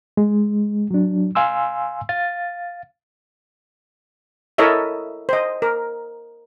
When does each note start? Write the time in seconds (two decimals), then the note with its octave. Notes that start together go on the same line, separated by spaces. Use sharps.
0.17 G#3
0.91 F#3 D4
1.35 F5 G#5 C6 E6
2.09 F5 A6
4.58 E4 A4 A#4 C#5 D#5 E5
5.29 C5 D#5
5.62 A#4